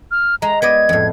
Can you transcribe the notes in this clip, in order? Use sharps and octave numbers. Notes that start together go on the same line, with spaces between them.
F6
G#3 A#5
B3 D5 D#5 G#6
F2 A2